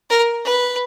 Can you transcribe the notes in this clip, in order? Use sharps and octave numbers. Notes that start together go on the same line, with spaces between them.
A#4
B4